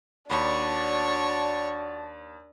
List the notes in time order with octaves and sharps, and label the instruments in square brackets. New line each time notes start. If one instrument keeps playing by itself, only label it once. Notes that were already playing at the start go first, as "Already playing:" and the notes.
[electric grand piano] D#2 B5 [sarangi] D4 [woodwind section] F#4 D5 A5 [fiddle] C#5